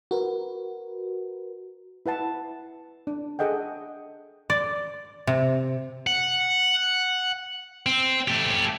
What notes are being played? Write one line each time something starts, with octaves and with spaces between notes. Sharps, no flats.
F#4 A#4 B4
E4 B4 F#5 A5
D4
G#4 A4 D#5 F#5 G5
D5
C3
F#5
C4
A3 G4